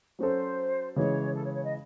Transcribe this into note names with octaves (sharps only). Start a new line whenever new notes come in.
F#3 C#4 F#4 A4 C5
C#3 E3 G#3 C#5
A4
C#5
C#5
D#5